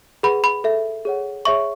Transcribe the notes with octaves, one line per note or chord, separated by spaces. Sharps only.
G#4 B4 F#5 B5
B5
A4 E5
G#4 C#5 F#5
G#4 C#5 E5 C#6